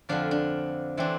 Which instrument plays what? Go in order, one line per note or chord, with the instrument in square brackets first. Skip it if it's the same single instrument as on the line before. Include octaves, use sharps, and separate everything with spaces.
[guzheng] F2 D3 F3 D4
D4
E3 A3 C4 D4